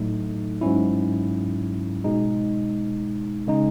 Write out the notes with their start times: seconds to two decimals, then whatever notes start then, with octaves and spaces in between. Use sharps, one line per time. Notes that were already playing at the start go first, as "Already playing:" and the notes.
Already playing: A2 F#3 A3 D#4
0.61 G#2 F#3 C#4 E4
2.04 B2 G#3 D#4
3.48 C#3 G#3 D#4